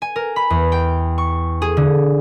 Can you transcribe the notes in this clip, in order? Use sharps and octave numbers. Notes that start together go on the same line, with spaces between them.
G#5
A#4
B5
E2
G5
C#6
G#4
D3